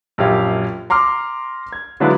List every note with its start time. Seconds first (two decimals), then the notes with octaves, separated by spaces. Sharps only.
0.18 A#1 F#2 G4 C#5 F5
0.90 A#5 C6 D6 F6
1.73 G#6
2.00 D3 F#3 G#3 E4 F4 B4